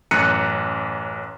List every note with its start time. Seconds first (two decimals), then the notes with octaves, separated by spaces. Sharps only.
0.11 A1 F#2 A#5 F#6 C#7 D#7